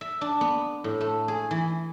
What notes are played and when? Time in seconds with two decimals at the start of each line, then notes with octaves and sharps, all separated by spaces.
0.01 E5
0.21 D4
0.41 B3
0.84 A2
1.01 A3
1.28 G#4
1.51 E3